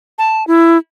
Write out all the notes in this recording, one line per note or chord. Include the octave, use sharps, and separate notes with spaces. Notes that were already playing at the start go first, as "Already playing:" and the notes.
A5
E4